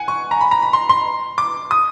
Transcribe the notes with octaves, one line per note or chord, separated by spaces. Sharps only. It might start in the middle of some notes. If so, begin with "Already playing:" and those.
Already playing: F#5 G#5
C#6
A#5
B5
A#5
B5
C6
C6
D6
D#6